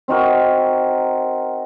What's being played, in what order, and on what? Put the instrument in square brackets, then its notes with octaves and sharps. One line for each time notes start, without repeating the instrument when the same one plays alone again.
[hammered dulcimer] C4 D#4 F#4 A#4